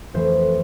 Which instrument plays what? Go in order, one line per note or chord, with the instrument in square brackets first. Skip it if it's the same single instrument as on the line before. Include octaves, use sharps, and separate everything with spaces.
[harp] F2 E3 A3 C5 E5